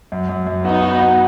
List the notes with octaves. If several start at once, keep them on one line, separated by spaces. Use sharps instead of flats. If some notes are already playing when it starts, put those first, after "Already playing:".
F#2
F#2
F#2
B3 D#4 F#4
F#4
F#4